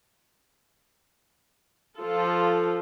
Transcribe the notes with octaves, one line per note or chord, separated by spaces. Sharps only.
F3 F4 A4